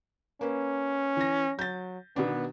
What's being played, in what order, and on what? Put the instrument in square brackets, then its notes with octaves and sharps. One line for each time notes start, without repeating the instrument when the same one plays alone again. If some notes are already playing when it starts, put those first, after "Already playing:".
[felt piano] A#3 B4 [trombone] C#4
[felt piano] E3 A#6
[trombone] F#3 [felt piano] G6 A6
[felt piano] B2 D#3 D4 [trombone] B3